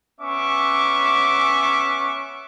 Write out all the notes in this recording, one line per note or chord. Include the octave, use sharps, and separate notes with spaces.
B3 C#4 E5 C#6 D6